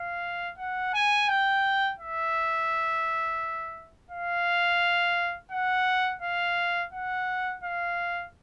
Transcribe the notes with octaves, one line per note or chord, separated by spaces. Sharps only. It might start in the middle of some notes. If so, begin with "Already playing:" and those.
Already playing: F5
F#5
G#5
G5
E5
F5
F#5
F5
F#5
F5